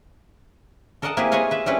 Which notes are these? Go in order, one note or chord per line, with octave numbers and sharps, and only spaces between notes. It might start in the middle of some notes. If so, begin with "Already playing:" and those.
A4 A#4 D5 D#5 F#5 A5
A#3 C4 E4 G4 G#4 B4
F4 G#4 B4 C#5 D#5 F5
B4 E5
G3 C4 C#4 E4 A4 B4